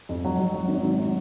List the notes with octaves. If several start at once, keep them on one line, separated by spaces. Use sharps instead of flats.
F2
F#3
F#3
F#3
G#1
G#1
F#3